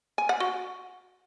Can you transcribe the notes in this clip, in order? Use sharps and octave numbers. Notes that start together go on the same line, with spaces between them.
G#5
F#5
F#4